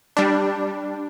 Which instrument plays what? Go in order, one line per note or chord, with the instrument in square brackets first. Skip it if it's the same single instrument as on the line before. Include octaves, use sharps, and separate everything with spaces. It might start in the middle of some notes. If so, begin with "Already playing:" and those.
[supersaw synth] G3 D4